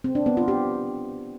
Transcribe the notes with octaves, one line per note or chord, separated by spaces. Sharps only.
C4
D4
B3
F4
G4